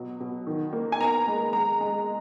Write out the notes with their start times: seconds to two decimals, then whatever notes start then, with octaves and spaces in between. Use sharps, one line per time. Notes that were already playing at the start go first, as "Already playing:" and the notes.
Already playing: B2 F#3
0.20 B2
0.47 D#3
0.73 A#3
0.92 G#5
1.00 B3 A#5
1.27 G#3
1.53 G#3 A#5
1.81 G#3